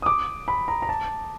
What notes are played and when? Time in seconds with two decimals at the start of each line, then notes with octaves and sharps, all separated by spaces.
0.02 D#6
0.06 D6
0.48 B5
0.68 A#5
0.82 A#5
0.89 A5